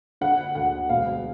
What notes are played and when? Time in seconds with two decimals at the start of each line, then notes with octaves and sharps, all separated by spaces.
0.21 D3 F#5
0.55 D2 F#5
0.89 E1 F5